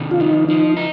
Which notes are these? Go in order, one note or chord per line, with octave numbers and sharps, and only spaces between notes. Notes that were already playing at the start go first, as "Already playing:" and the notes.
Already playing: C3 D#3
F4
F3 D#4
F3 D#4
D#4